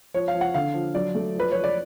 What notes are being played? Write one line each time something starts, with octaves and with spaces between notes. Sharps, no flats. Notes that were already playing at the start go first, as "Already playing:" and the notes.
F3 C#5
F5
F3
F#5
D3 F5
F3
F#3 D5
A3
F3 B4
F3 C#5
D5